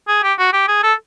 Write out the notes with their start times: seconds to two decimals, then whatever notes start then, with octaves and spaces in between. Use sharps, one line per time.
0.08 G#4
0.23 G4
0.38 F#4
0.53 G4
0.68 G#4
0.83 A4